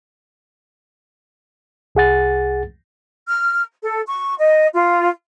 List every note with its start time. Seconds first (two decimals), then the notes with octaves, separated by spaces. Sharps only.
1.95 C2 G#4 F#5 A6
3.27 F6
3.83 A4
4.07 C#6
4.39 D#5
4.73 F4